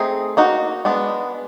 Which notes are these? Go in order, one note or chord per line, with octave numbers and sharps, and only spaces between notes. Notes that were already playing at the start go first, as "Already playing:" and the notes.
Already playing: A3 C4 D#4 G#4
A#3 D#4 F#4
G#3 B3 D4